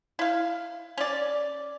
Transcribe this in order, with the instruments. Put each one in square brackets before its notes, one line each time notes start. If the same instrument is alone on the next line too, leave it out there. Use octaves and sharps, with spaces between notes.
[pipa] E4 F5
C#4 D5